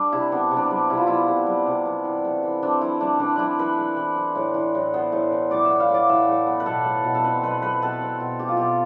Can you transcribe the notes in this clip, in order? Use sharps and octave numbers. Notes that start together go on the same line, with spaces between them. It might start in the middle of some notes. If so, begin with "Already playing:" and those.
Already playing: G3 D4
C3 E4
B3 D4
C3
D4
G3
C3 E4
F4
B3 E4
C3
G3
C3
B3
E3
A3
E3
C4 D4
E3 E4
A3 D4
E3 D4
C4 D4 E4
E3 B4
A3
E3
C4
A2
E3
A2
B3 C5
A2
E3
A2 D5
E5
B3
F5
A2 D5
E3 E5
A2
B3
B4
B2 A4
A3
B2
A4
C4 B4
B2 B4
A3 B4
B2 A4
C4
B2
A3 G4
F4
B2 G4